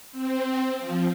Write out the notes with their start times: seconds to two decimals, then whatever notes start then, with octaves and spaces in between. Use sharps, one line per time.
0.12 C4
0.79 F3